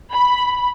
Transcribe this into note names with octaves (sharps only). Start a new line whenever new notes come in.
B5